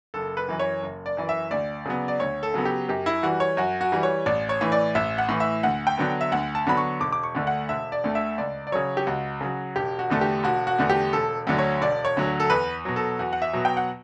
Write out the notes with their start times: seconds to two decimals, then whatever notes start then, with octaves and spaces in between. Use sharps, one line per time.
0.14 F#1 A4
0.37 B4
0.49 F#2 E3
0.59 C#5
0.82 F#1
1.06 D5
1.17 F#2 E3
1.29 E5
1.51 D2 D5
1.85 C#3 F#3 B3
2.08 D5
2.20 D2 C#5
2.43 A4
2.54 C#3 F#3 B3
2.65 G4
2.89 F#2 G4
3.06 E4
3.23 E3 G3 F#4
3.40 C#5
3.57 F#2 F#4
3.81 F#4
3.92 E3 G3
4.03 C#5
4.26 A1 D5
4.49 C#5
4.61 A2 E3
4.72 D5
4.95 A1 E5
5.18 F#5
5.29 A2 E3
5.40 E5
5.63 D2 F#5
5.87 G5
5.97 D3 F#3 B3
6.21 E5
6.32 D2 F#5
6.55 A5
6.67 D3 F#3 B3 B5
6.77 C#6
7.00 E1 D6
7.12 D6
7.23 C#6
7.35 D2 D3 A3
7.47 F#5
7.69 E1 E5
7.92 D5
8.04 D2 D3 A3
8.15 E5
8.38 C#2 D5
8.67 D5
8.72 C#3 F#3 C#5
8.97 G4
9.07 C#2 F#4
9.41 C#3 F#3
9.76 E1 G4
9.99 F#4
10.10 E2 D3 A3
10.21 G4
10.44 E1 F#4
10.67 F#4
10.79 E2 D3 A3
10.90 G4
11.13 E1 A4
11.47 D2 D3 F#3
11.59 C#5
11.82 E1 D5
12.05 C#5
12.17 D2 D3 F#3
12.40 A4
12.50 E2 B4
12.85 B2 F#3
12.96 A4
13.19 E2 F#4
13.33 F#5
13.42 E5
13.53 B2 F#3
13.65 G5
13.77 F#5